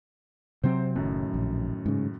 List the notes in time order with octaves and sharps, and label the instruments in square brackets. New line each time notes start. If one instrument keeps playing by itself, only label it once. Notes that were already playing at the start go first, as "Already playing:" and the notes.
[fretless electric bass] C3 F#3 C4 [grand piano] C5
[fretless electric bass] F#1 [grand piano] F#2 A2 D#3
[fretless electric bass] A#1
G#2 C#3